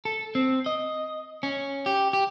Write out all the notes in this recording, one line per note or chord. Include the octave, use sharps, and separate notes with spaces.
A4
C4
D#5
C#4
G4
G4